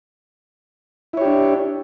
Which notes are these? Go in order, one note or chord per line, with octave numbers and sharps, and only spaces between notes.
D4 E4 G4 C#5